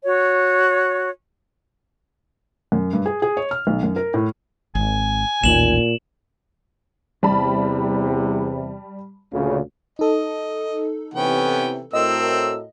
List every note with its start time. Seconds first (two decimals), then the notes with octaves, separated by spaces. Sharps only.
0.04 F#4 C#5
2.72 F#2
2.93 G2
3.06 G#4
3.22 G#4
3.37 C#5
3.51 F6
3.67 B1
3.83 F#2
3.96 A#4
4.14 A2
4.75 G#1 G#5
5.44 A1 D#2 A#2 E7 F#7
7.23 E2 C3 G3 A5 B5
9.32 D2 A#2 C#3
9.99 D#4 A4 D#5
11.14 C3 E3 B3 C#4 G5
11.93 A2 C4 F#4 A#4 D#5 E6